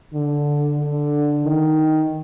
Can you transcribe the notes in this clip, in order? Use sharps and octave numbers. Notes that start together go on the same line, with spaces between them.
D3
D3
D#3